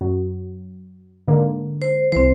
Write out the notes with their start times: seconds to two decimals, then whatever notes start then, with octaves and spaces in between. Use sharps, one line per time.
0.01 F#2 F#3
1.28 G#2 D3 A#3
1.82 C5
2.12 C2 E3 C4 C5